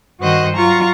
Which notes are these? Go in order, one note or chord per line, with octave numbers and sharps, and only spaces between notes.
G2 D#3 F#4 C5 D#5 F#6
F#3 F4 A#5 C#6